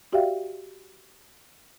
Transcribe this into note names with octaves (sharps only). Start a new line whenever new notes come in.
F#4 G4 D5 E5 F5 G5